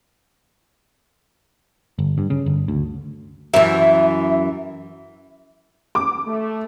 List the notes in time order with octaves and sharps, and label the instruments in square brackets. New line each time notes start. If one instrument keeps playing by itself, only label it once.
[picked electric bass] G1
G2
C#3
G1
D2
[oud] F#2 E3 [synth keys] E5
[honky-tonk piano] D6
[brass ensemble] A3